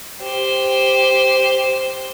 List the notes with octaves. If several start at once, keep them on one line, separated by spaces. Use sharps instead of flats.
G4 C5